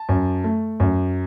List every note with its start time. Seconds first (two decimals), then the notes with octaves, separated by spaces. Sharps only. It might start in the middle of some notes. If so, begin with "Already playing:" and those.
Already playing: A5
0.09 F#2
0.44 A3
0.80 F#2